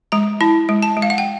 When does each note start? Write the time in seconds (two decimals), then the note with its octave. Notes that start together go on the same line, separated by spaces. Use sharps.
0.12 G#3 A#5
0.41 E4 A5
0.69 G#3
0.82 A5
0.97 G#3
1.02 F5
1.10 F#5
1.18 G5